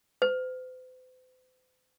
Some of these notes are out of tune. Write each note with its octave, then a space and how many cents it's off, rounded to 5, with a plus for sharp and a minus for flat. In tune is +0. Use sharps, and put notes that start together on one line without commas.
C5 -45